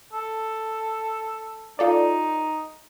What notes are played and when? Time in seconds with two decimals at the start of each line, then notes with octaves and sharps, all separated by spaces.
0.13 A4
1.79 D#4 F4 A4 D5